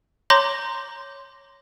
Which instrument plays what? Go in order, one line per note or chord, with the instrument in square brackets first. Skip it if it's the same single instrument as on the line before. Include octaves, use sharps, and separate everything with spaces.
[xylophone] C#5 A#5 C6 D6 G6 A#6